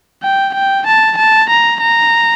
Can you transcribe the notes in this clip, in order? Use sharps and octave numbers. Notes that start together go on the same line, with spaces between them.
G5
G5
A5
A5
A#5
A#5